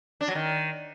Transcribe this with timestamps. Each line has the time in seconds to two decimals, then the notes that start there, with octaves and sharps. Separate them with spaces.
0.21 D4
0.28 F#3
0.35 D#3